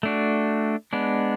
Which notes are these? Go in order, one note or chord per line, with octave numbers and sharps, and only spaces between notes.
A3 D4 F#4
G#3 B3 D4